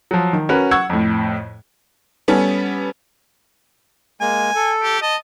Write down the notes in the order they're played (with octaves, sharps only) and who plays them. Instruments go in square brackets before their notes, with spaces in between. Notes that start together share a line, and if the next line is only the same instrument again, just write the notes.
[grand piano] F3 F#3
D#3
C#4 F#4 A#4 B4
F#5 C#6 E6 G#6
F2 A2
[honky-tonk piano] G3 B3 C#4 A4
[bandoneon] G#3 A#3 [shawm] G#5
[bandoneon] A4
[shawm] G4
[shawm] D#5 [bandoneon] A5